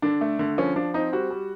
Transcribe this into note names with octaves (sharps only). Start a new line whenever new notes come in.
D3 D4
A3
D3
F3 C#4
F3 D4
C4 D#4
G3 F#4
G3